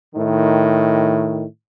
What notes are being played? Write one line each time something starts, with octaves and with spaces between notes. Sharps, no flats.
A2 D#3